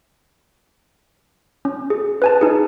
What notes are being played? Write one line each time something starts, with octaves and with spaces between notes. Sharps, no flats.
C#4
G#4
B4 G#5 A5
D#4 G#4